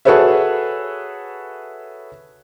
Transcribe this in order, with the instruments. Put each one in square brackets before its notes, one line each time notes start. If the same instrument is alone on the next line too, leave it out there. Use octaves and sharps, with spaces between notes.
[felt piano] F#4 G#4 A4 B4 C#5 E5